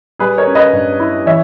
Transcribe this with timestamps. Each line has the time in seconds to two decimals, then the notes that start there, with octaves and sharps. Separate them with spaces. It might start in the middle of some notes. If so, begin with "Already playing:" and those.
0.19 G3 G#4 B4
0.38 A#4 C#5
0.47 C#4
0.55 B4 D#5
0.73 G2
1.00 E4
1.26 E3 C#5 E5